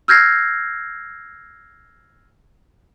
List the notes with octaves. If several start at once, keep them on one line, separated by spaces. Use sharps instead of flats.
E6 F6 G6 G#6 A#6 C7